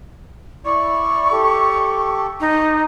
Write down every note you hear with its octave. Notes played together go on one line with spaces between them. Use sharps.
E4 D5 C#6
G4 A4
D#4